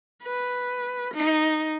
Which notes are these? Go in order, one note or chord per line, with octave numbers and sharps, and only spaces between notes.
B4
D#4